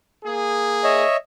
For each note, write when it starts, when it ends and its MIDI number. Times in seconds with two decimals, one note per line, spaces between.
0.24 1.04 58
0.24 1.04 68
0.84 1.16 73
0.84 1.16 75
0.84 1.16 76